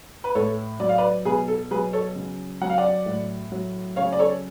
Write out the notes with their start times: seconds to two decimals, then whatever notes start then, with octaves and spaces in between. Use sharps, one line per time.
0.24 B4
0.35 A2 A4 C#5
0.80 F#3 D5
0.89 F5
0.98 B4 D5
1.25 B2 G#4 B4
1.48 A4
1.71 F#3 G#4 B4
1.93 A4 C#5
2.15 C#3
2.61 F#3 F#5
2.70 F5
2.78 D5 F#5
3.06 A2
3.52 F#3
3.96 C#3 C#5 F5
4.13 D5
4.19 A4 C#5